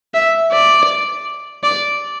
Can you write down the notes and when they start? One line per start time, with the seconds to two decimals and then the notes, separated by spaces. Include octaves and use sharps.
0.14 E5
0.52 D5
1.63 D5